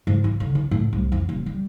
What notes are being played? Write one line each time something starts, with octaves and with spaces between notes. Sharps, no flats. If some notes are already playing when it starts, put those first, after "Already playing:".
G#2
F4
D3
D4
A2
C2
F2
D#1
G3